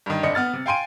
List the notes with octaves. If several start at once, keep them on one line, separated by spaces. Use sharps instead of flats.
G2 D#3
F1 D4 D#5 C#7
B3 F6 A6
C3
F5 G5 G#5 C6 D7 D#7